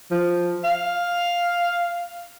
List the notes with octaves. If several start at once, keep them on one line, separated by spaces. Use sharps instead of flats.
F3
F5